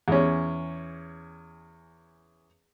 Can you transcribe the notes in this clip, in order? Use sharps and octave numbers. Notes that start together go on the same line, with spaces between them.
E2 C#4